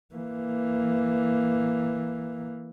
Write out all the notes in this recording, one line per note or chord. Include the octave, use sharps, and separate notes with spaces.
E3 A#3